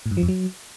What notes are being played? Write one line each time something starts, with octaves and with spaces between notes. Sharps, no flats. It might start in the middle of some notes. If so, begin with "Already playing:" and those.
A2
G2
F3
F2
F#3